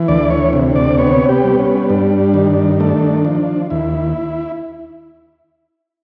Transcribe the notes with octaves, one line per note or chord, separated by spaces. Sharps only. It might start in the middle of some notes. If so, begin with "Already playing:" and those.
Already playing: E3
D2 D5
C#5
C3
D5
B3 C#5
G4
G3
C#4
G2 D4
D#3
A3 D4
F3
D#2 E4